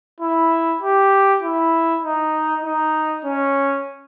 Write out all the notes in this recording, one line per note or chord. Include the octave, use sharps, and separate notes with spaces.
E4
G4
E4
D#4
D#4
C#4